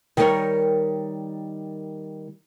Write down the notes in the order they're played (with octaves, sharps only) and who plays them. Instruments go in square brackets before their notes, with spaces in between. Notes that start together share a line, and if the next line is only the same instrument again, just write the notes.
[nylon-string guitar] D#3 G3 D#4 A#4 C#5